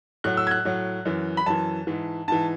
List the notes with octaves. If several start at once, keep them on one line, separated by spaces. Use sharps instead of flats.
A2 F#3 F#6
E6
G#6
F#6
A2 F#3
F#2 E3
B5
F#2 E3 A5
G#2 E3
G#2 E3 A5